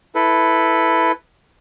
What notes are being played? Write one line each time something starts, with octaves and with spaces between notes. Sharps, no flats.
E4 A4 B4